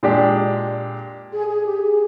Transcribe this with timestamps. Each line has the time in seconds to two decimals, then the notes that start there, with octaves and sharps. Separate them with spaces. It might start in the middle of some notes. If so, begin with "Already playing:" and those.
0.03 A#2 G#3 D4 G4
1.33 G#4
1.49 G#4
1.65 G4
1.81 G#4